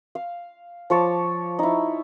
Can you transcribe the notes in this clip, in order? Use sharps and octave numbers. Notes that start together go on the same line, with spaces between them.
F5
F3 C#5 A5 D6
D#4 E4